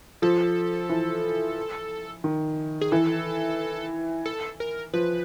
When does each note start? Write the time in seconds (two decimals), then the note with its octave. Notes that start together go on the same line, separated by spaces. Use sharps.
0.22 F3 A4
0.89 E3
2.24 D#3
2.81 G#4
2.92 E3 A4
4.26 A4
4.60 A#4
4.94 F3 B4